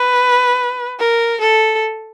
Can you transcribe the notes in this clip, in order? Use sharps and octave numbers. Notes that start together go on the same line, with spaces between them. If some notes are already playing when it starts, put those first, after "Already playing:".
Already playing: B4
A#4
A4